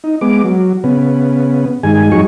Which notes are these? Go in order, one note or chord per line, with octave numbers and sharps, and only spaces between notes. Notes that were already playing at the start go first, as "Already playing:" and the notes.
D#4
G#3 B3 D6
F#3
C#3 B3
G2 D#3 G#3 G#5
F2 F#3 G3 D#4 G#4 C#6